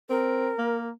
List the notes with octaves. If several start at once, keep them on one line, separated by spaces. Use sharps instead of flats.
C4 A#4
A#3